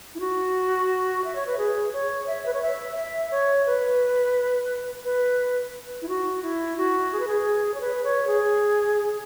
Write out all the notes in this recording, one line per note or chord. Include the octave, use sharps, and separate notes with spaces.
E4
F#4
E5
C#5
B4
G#4
C#5
E5
B4
C#5
E5
E5
C#5
B4
B4
E4
F#4
E4
F#4
G#4
B4
G#4
C#5
B4
C#5
G#4